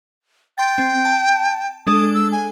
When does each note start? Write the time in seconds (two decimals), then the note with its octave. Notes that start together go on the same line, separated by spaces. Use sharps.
0.58 G5 C6 A6
0.78 C4
1.05 A5
1.87 G#3 D4 A4 D#6
2.14 E6
2.32 G#5